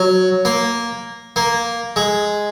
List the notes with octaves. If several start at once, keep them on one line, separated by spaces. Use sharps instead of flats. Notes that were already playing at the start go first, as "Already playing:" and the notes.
Already playing: F#3
A#3
A#3
G#3